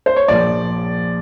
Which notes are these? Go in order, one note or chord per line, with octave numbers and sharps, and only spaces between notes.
C5
C#5
A#1 A#2 F3 D5